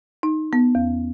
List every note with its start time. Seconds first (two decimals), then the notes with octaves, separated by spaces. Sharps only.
0.23 D#4
0.53 B3
0.75 E2